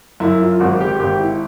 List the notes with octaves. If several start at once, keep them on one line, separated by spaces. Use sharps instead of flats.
F#2 E4
F4
G#1 F#4
G4
G#1 G4
E4